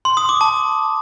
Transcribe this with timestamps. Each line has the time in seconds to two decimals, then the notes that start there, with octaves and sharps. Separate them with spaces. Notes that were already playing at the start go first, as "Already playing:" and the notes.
0.05 C6
0.17 D#6
0.29 D6
0.41 A5